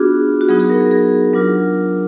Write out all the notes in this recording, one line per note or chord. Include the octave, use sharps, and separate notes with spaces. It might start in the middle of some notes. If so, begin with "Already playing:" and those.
Already playing: B3 D4 F4 F#4 G#4
F#4
F#3 B3 D#4 G#4
G#4
A#4
A#4
G#4
F#3 D4 F4 A#4